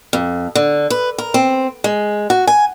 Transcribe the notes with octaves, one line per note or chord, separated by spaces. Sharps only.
F2
D3
B4
A#4
C4
G#3
F#4
G#5